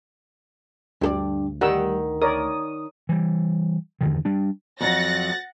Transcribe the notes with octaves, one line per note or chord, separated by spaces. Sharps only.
D2 G2 A4 D5
D#3 G3 F#5 E6
A#4 C#5 D5 D#6
E3 G3
E2 G2 D3 D#3
G3 D4
F2 F#3 F#5 A6 A#6